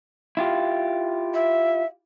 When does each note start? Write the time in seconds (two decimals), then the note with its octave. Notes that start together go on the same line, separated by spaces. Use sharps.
0.37 E4 F4 G4
1.34 E5